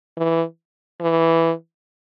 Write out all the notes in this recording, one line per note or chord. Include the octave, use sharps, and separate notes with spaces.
E3
E3